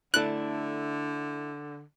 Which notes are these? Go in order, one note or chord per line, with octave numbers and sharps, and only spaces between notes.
D3 A3 D4 E4 F#6